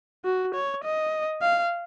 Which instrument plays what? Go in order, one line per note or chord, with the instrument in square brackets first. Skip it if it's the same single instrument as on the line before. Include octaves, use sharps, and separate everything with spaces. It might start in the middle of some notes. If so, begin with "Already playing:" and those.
[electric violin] F#4
C#5
D#5
F5